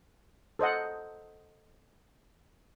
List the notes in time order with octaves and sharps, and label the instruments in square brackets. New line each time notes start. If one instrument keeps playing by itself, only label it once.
[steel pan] A4 C5 D#5 F#5